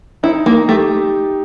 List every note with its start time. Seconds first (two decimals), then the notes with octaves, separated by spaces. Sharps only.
0.23 D#4 E4
0.46 A#3
0.68 A3 G4